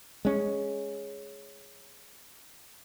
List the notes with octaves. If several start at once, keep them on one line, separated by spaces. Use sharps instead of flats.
G#3 C#4